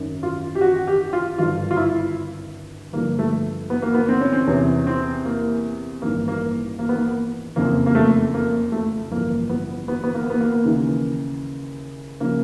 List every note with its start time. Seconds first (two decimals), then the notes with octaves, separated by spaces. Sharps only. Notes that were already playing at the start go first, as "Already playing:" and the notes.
Already playing: G#1 F#2 D#3
0.23 F4
0.55 G4
0.61 F#4
0.87 G4
1.13 F4
1.38 G#1 G2 D3 F4
1.71 F4
1.77 E4
2.92 G1 G2 D3 F3 A#3
3.19 A3
3.70 B3
3.82 A#3
3.94 B3
4.09 C4
4.21 C#4
4.33 C4
4.47 E2 C3 E3 C#4
4.87 C4
5.25 A#3
6.02 A1 G2 D#3 A#3
6.28 A#3
6.79 A#3
6.89 B3
6.98 A#3
7.56 F#1 F2 C#3 F3 A#3
7.86 A#3
7.95 A3
8.34 A#3
8.72 A3
9.11 A1 G2 D3 F3 A#3
9.49 B3
9.88 B3
10.04 B3
10.14 A#3
10.30 B3
10.40 A#3
10.65 D#2 C#3 E3
12.20 C#3 F3 A#3